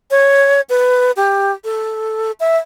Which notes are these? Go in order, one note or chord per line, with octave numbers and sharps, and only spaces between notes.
C#5
B4
G4
A4
E5